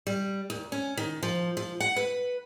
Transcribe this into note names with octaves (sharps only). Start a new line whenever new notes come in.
G3
D#2
C#4
D#3
F3
F3
F#5
B4